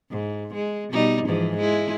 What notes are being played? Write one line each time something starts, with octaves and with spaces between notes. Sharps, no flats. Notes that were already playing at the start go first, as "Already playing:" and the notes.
G#2
G#3
B2 G3 D#4
G#2 E3 F3
G#3 E4